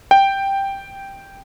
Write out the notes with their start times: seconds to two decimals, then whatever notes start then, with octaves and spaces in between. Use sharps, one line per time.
0.11 G5